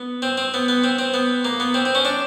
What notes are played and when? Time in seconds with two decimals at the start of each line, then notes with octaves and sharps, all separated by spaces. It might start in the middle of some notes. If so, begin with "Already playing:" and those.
Already playing: B3
0.22 C4
0.38 C4
0.54 B3
0.68 B3
0.84 C4
0.99 C4
1.14 B3
1.45 A#3
1.60 B3
1.74 C4
1.85 C4
1.95 C#4
2.05 D4